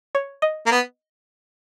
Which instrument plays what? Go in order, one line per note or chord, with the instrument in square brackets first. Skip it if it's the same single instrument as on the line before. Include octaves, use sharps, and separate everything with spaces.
[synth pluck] C#5
D#5
[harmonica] A#3
B3